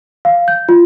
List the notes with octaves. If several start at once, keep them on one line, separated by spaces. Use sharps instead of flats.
F5
G6
F4